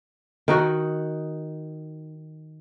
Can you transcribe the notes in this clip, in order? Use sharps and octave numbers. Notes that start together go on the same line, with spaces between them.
D#3 D#4 F#4